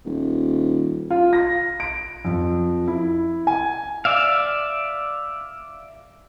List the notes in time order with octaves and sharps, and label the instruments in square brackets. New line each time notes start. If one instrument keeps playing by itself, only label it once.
[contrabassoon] D#1
[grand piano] F4
A#6
D7
F2
E4
G#5
[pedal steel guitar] D5 E5 F5